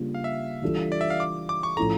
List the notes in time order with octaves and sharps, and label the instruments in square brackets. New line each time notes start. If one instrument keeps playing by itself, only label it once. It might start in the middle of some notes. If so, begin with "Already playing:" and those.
Already playing: [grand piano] C#3 G3 A#3 D4 F4
[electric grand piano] F5
E5
[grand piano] E3 G3 D4 F4 A4
[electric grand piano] D5
E5
F5
D6
D6
C#6
[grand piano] A2 F3 C#4 E4 A4 [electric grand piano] A#5